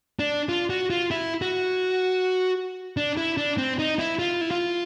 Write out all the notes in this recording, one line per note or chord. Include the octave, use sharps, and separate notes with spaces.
D4
F4
F#4
F4
E4
F#4
D4
E4
D4
C4
D#4
E4
F4
E4
F4